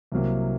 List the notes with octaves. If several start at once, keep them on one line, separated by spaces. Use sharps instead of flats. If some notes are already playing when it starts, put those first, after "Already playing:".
C2 C3 F#3 A#3